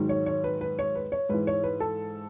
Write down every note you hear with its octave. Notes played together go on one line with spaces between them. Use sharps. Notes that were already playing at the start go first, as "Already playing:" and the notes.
Already playing: G#2 D#3 F#3
C#5
C#5
B4
B4
C#5
B4
C#5
G#2 E3 B4
C#5
B4
A4